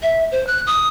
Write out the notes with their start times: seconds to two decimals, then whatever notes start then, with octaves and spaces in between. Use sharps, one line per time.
0.03 E5
0.32 C5
0.47 F#6
0.67 D#6